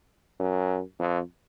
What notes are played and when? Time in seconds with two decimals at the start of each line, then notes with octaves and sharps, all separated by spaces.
0.40 F#2
0.99 F2